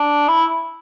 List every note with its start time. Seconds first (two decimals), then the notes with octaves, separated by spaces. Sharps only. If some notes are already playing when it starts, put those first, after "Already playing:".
Already playing: D4
0.28 E4